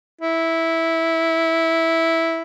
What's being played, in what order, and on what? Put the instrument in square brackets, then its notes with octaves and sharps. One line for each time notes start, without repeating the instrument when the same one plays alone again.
[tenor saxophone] E4